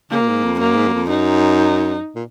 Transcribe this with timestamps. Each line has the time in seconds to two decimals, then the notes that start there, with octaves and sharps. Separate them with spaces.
0.11 C#3 A#3
0.20 A#2
0.28 G#2
0.44 F2
0.60 F#2 A#3
0.76 G#2
0.87 F#2
0.93 F2
1.09 F#2 D#4
2.16 A#2